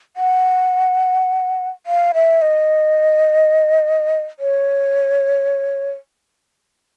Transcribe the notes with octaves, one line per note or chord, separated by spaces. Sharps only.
F#5
F5
E5
D#5
C#5